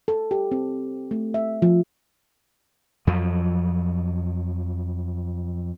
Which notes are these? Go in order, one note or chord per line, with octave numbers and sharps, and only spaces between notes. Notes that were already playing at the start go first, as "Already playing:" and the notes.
A4
G4
C4
A3
E5
F3
F2 F3 F#3